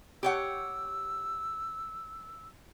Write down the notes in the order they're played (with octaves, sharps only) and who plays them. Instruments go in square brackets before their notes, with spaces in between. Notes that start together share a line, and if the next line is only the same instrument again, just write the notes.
[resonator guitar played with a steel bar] G4 C#5 F#5 [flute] E6